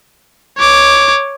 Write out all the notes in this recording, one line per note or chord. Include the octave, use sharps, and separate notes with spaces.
C#5 D6